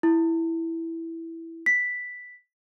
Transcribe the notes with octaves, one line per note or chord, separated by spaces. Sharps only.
E4
B6